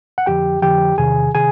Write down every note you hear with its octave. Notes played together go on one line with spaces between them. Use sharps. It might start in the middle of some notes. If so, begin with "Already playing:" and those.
F#5
F2 D3 F3 G4 G5
F2 D3 F3 G4 G5
E2 C3 D#3 G#4 G#5
C3 D#3 G#4 G#5